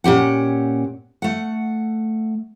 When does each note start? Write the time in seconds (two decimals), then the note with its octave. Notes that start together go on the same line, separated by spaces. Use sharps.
0.04 A#2 C#4 G4 F#5
1.22 A3 F#5